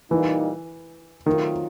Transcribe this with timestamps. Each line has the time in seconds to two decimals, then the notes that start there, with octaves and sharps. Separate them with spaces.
0.10 A#2 E3 G3 A#3 D#4
1.26 D#3 F#3 A3 C4 F4